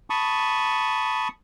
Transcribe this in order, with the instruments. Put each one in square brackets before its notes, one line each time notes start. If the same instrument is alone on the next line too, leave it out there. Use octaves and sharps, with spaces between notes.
[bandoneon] A5 B5 C#6 D#6